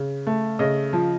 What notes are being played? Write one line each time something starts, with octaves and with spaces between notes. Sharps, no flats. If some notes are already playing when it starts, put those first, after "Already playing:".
Already playing: C#3
A3
C#3 D#5
F3